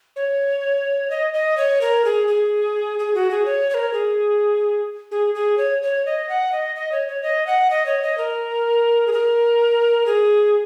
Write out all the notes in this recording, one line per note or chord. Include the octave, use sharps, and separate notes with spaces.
C#5
D#5
D#5
C#5
A#4
G#4
G#4
G#4
F#4
G#4
C#5
C#5
A#4
G#4
G#4
G#4
C#5
C#5
D#5
F#5
D#5
D#5
C#5
C#5
D#5
F#5
D#5
C#5
D#5
A#4
G#4
A#4
G#4